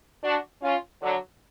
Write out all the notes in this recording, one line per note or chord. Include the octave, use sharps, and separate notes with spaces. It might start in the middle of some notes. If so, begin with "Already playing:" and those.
D4 F#4
C#4 F4
D3 F#3